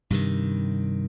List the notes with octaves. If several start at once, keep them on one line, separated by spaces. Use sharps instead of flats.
G2 C3 D#3